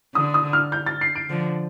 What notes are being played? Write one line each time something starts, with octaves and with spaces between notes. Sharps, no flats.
D3 D#6
D#6
F6
G6
A6
C7
D7
D3 F3